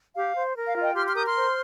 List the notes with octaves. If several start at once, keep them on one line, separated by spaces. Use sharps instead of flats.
G4 F5
C5
A#4
F5
F4
D#5 G5
G4 C6 F6
C6 F6
A#4 D#6 G6
C6 F6
C5